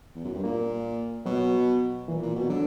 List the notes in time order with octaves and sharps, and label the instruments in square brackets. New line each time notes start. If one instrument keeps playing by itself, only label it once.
[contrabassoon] E2
F#2
G2
[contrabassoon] A#2 [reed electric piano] A#3
[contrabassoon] B2 [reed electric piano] F#3
[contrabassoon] A#2 [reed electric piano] E3
[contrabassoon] A#2
B2
[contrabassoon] D3 [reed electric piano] F#3